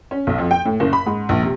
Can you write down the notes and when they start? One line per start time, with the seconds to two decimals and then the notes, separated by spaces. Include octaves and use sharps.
0.11 C#4
0.27 B1
0.39 F2
0.51 G5
0.65 A2
0.80 F#1
0.93 B5
1.06 G#2
1.29 A#1
1.43 C3